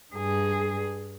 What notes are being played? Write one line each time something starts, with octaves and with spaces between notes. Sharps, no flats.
G2 G#4